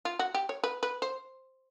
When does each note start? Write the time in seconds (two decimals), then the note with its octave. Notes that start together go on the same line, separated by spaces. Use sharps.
0.05 F4
0.19 F#4
0.34 G4
0.49 C#5
0.64 B4
0.83 B4
1.02 C5